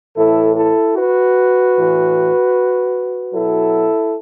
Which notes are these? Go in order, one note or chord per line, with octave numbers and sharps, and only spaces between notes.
A2 E3 E4 A4
E4 A4
F#4 B4
A2 E3
B2 F#3 E4 A4